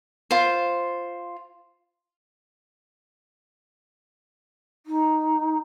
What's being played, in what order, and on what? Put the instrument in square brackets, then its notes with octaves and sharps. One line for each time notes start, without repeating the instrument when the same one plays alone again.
[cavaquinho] F4 C5
[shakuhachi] D#4